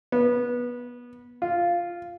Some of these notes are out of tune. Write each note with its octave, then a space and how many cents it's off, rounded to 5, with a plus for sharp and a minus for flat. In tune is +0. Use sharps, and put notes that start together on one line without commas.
B3 -20
F4 -5